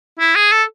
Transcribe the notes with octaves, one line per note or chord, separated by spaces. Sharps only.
E4
G#4
A4